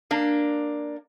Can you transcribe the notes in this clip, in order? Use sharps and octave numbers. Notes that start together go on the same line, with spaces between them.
A#3 D4